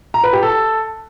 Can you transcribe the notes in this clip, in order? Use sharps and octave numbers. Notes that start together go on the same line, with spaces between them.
A#5
B4
G4
A4